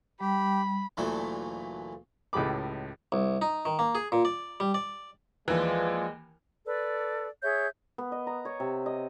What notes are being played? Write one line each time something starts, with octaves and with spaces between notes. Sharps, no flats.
G3 G4 B5
D2 A#2 E3 F#3 A3
C#2 A2 G#3 G4 B5 D6
C2
D#4
D#3
A#3
G#4
A#2
D5
G3
D5
D#2 E3 F3 G#3 B4 D5
A4 B4 D5
G#4 C#5 E5 G6
B3
D#5
A#5
C#5
C3
D#5